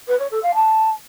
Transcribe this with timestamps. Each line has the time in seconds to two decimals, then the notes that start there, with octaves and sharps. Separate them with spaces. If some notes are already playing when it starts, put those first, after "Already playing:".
0.08 B4
0.20 C#5
0.31 A4
0.43 F5
0.55 A5